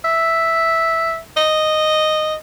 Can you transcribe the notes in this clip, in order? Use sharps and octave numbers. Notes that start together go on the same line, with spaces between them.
E5
D#5